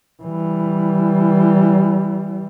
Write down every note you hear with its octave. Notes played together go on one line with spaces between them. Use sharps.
E3 G3